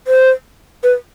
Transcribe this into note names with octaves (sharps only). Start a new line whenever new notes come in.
C5
B4